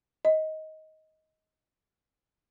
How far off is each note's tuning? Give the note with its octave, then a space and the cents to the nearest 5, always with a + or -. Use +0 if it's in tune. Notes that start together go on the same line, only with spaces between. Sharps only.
D#5 +15